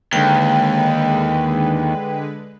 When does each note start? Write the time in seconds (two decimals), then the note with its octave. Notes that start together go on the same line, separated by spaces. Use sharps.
0.13 D#2 D3 G#3 B4 G5